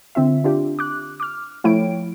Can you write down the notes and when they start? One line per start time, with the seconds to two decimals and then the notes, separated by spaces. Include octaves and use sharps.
0.15 D3 C4 F4 E5
0.44 D4 F4 G4
0.79 D6 F#6
1.20 D6 F6
1.64 F3 A3 E4 C#5 G5 D7